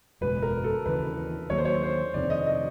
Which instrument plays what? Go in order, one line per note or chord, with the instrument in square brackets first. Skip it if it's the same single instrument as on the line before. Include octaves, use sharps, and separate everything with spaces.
[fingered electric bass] F#1 E2 B2 G#3 [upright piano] B4
[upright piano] A#4
A4
[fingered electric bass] D#2 C#3 E3 [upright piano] B4
[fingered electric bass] D#2 D#3 F#3 A#3 [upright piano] C#5
[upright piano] C5
C#5
C5
[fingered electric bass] F2 C3 D#3 [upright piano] D5
[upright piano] D#5
D#5